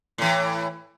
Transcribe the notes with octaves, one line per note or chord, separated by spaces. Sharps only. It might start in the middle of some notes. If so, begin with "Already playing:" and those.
A2 E3